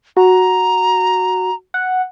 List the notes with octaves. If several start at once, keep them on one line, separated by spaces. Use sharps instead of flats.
F#4 A#5
F#5